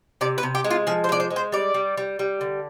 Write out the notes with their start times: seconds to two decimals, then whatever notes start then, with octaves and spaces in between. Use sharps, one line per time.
0.21 C3 D5
0.38 B4
0.43 C3
0.55 G4
0.64 G#3
0.70 F4
0.87 F3 G#4
1.04 C5
1.09 G#3 D5
1.20 C5
1.30 G#3
1.36 C5
1.52 G3 D5
1.74 G3
1.97 G3
2.19 G3
2.41 D3